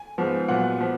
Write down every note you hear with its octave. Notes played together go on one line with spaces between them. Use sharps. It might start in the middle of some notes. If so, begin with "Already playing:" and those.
Already playing: G#5
G#2 F3 B3
A#2 F#3 B3 F#5
F3 B3